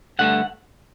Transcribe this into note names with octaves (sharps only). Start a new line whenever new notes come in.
G2 D3 A3 F#5